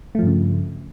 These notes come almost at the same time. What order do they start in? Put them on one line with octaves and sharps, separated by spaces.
A3 F3 G2 C#3